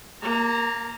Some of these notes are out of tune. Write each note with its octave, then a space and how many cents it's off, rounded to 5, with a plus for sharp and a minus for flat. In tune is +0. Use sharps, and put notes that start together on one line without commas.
A#3 +0 A#5 -40